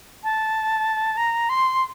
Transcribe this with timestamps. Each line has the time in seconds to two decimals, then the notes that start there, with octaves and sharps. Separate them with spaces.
0.24 A5
1.17 A#5
1.49 C6